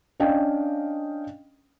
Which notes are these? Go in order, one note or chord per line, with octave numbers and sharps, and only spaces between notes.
C#4 D4 D5 D#5 F5 G5